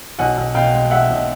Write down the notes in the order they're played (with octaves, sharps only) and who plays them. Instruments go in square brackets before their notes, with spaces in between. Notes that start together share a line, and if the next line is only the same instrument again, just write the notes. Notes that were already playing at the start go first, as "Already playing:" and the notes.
[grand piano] B1 [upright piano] F#5 G#5
[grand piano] B1
[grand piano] B2 [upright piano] F5 G5
[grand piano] G#3
[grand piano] G#3 [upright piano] E5 F#5
[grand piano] B1